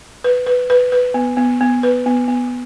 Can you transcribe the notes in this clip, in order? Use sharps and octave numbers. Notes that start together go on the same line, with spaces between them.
B4
B4
B4
B4
B3
B3
B3
B4
B3
B3